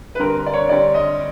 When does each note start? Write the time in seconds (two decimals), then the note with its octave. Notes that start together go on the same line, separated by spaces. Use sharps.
0.15 B4
0.19 D3 G3 C4 A#4
0.46 D5
0.54 C#5
0.69 D3 G3 C4 D5
0.94 D#5